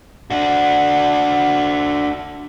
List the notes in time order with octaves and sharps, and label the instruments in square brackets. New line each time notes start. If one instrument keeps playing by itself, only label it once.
[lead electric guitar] D4 F#4